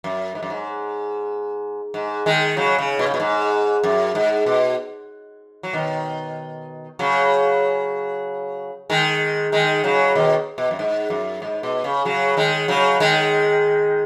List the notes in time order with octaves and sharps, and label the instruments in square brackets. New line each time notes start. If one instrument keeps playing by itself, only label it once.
[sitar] F#2
G#2
F#2
G#2
G#2
D#3 G#3
C#3 F#3
C#3
B2
C#3
B2
G#2
F#2
G#2
B2
F#3
B2 D#3
C#3 F#3
D#3 G#3
D#3 G#3
C#3 F#3
B2 D#3
B2
F#2
G#2
F#2
G#2
B2
C#3
C#3 F#3
D#3 G#3
C#3 F#3
D#3 G#3